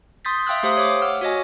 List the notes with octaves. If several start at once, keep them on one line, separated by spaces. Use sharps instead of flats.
C6 D#6 G6 A6 B6
E5 F5 G5 C6 E6 F#6
A3 G4 C5 F5 C6 D#6
C#5 D6
F#5 E6 F6
F#4 C#5 D#5 G#5